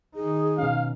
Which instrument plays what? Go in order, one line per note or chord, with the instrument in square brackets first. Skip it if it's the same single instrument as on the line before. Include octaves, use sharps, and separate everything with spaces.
[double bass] D#3 D#4 [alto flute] G#4
[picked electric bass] B2 C#4 [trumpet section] F5